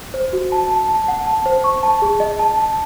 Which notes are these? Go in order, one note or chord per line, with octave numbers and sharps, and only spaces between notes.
C5
F#4
A5
A5
A5
F#5
A5
C5
C#6
A5
G#4
D#5
A5
A5